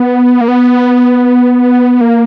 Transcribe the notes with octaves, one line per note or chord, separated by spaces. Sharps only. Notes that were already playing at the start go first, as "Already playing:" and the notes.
Already playing: B3
A#3
B3
A#3